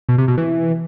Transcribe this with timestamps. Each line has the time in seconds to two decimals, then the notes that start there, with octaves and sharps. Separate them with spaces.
0.09 B2
0.18 C3
0.28 B2
0.38 E3